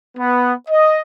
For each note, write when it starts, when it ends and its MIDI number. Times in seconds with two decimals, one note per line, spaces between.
0.18 0.52 59
0.69 1.00 75